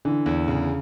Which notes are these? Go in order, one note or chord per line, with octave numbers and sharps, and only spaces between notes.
D3 E3
E2
C#3